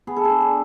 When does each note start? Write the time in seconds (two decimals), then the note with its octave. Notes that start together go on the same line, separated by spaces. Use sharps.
0.07 B3 G#4
0.17 A4
0.25 D4 G#4
0.41 A4